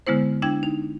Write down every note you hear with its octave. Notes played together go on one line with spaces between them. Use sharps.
D3 G#3 B3 E4 C5
D4 E4 G5 G#6
D#4